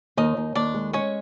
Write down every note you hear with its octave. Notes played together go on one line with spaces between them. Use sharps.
D#2 D#4 D#5
D#2
D#2 D4 D5
G#3
G#3 C#4 C#5